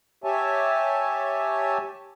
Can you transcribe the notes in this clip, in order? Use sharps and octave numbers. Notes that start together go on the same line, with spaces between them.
G4 C#5 E5 G#5 A5